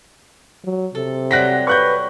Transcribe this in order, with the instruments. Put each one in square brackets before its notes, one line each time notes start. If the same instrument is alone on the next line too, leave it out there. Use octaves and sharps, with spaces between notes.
[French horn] F#3
[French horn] C3 [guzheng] A4
[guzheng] F#3 G3 C4 [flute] F#5 [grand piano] F#6 A#6 B6
[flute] B4 [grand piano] C#6 F#6 G6